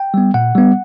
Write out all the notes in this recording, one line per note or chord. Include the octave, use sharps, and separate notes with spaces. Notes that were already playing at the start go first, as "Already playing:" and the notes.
Already playing: G5
G3 B3
A#2 F#5
G3 B3